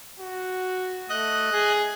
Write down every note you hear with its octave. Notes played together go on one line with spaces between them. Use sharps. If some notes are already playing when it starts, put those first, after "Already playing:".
F#4
A3 D#5 F#6
G#4